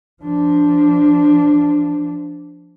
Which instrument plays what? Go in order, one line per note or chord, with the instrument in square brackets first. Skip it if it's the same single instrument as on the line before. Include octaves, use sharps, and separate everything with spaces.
[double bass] F3 D4